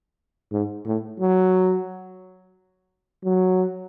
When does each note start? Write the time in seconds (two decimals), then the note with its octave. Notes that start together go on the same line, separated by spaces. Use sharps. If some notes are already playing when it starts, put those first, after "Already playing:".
0.52 G#2
0.85 A2
1.20 F#3
3.25 F#3